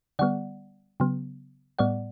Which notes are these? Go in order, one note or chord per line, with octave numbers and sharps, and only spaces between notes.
D3 G3 B3 D5 F#5
C#3 F#3 B3
A2 G3 B3 D5 F#5